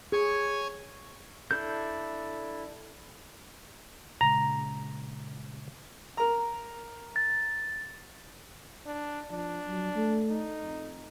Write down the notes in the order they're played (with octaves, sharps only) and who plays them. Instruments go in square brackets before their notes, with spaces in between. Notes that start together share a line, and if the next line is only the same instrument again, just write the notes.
[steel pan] G#4 [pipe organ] C#5 G#5 C#6
[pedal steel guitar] D4 E4 A4 G6
[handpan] A#2 C#3 G#3 [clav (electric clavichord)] A#5
[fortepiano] A#4 A#5
[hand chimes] A6
[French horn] D4
[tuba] F3 [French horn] D4
[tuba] F#3
A3
[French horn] D#4
[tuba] F2